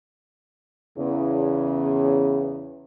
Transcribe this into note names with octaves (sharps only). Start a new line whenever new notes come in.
E2 C#3